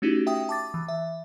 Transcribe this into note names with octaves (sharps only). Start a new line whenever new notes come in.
A3 C#4 D#4 E4 F#4 G4
E5 G5 D#6
A5 D6 A6
E3
E5